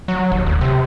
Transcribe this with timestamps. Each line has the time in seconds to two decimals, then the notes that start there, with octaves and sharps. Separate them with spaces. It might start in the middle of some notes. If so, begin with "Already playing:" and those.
0.08 F#3
0.32 D#1
0.46 D2
0.61 C3